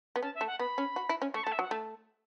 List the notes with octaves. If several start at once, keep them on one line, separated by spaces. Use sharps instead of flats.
B3
C#4 A5
E5
A3
F#5
B3 B5
C#4
F#4
E4
C#4
A3 C#6
A5
A3
E5
F#3
F#5
A3 A5